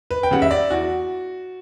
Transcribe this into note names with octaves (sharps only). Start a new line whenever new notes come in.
B4
G5
C#3 G3 F#5
E5
D5
E2 F#4